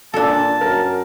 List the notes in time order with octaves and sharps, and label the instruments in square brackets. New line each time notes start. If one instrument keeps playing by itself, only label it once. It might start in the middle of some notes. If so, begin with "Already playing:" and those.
[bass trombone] A#2 [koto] D4 A4 [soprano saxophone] A5
[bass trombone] F#2 [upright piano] A#4